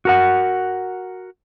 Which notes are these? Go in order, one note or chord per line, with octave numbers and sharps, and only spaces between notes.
F#4 A#4 F#5